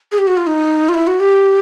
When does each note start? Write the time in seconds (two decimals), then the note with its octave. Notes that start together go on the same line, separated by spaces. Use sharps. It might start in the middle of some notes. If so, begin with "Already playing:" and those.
0.12 G#4
0.18 G4
0.27 F#4
0.37 F4
0.47 D#4
0.89 F4
0.94 E4
1.07 F#4
1.20 G4